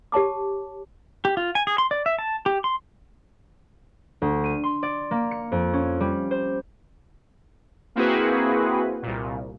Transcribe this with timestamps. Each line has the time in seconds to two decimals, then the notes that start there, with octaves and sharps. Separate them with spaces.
0.12 G4 C#5 A5 D6
1.25 G4
1.37 F4
1.55 G#5
1.67 G#4
1.78 C6
1.91 D5
2.06 E5
2.19 A5
2.46 G4
2.64 C6
4.22 D2
4.44 D#7
4.63 C6
4.83 D5
5.11 A#3
5.31 C#7
5.52 F2
5.73 C#4
6.00 G3
6.31 C5
7.95 A#3 C4 E4 F#4 G#4 B4
9.02 C2 A#2